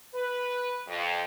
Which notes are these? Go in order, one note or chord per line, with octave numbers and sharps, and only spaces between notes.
B4
F2